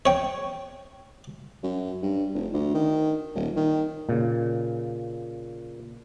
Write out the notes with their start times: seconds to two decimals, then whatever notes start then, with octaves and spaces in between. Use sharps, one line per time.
0.06 C#5 G5
1.63 F#2
2.02 G2
2.34 F1
2.53 D2
2.74 D#3
3.35 D#1
3.56 D#3
4.09 A#2 C#3